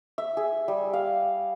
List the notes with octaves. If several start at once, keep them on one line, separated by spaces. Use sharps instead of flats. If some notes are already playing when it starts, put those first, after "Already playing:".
E5
G#4
G3
F5